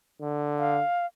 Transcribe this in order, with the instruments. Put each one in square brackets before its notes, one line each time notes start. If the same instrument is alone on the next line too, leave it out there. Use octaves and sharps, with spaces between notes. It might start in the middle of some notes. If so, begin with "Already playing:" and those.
[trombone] D3
[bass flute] F5